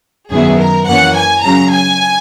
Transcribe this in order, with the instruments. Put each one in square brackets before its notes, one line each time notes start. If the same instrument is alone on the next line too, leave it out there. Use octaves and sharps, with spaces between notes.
[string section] F#2 D#3 F#3 B3 E4 G#4
A#4
F#2 E3 A#3 C#4 F#5
G#5
C#3 F#3 C#4 A#5
G#5